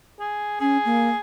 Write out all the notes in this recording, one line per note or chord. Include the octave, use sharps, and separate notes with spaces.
G#4
C#4 G#4
A#3